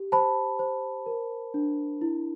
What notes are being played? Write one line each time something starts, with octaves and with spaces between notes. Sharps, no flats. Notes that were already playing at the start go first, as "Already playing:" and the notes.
Already playing: G4
C5 A5 B5
C5
A#4
D4
E4